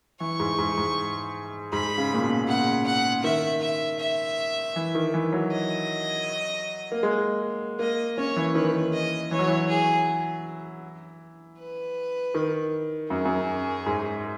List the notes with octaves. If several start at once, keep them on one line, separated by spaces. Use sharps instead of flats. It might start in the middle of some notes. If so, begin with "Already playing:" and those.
E3 C#6
G#2
G#2
G#2
G#2 B5
C#3
A#2
B2
C#3 F#5
F#5
D#3 E5
E5
E5
E3
D#3
E3
F#3
D#5
A#3
G#3
A#3 D#5
C#4 C#5
E3
D#3 B4
E3
D#3
D#5
E3 C#5
F#3
E3
G#4
B4
D#3
F#2 G#4
F#2
G#2